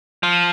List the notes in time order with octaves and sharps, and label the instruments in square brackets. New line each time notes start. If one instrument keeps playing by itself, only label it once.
[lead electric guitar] F3